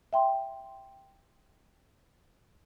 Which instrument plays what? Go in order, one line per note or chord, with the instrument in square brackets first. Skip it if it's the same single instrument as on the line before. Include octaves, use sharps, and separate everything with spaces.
[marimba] E5 G5 C6